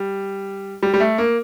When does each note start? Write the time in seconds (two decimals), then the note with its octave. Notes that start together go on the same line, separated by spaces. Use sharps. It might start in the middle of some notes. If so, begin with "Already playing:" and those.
Already playing: G3
0.83 G3
0.94 G3
1.00 A3
1.18 A#3